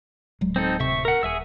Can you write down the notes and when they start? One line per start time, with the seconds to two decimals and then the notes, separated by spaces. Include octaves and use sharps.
0.41 D1 F#3 G#3
0.56 C4 D#4 A4
0.80 D1 C3 E5 C#6
1.05 A#4 F#5
1.23 D#1 G#4 E5 E6